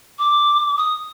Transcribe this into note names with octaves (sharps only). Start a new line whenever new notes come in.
D6
D#6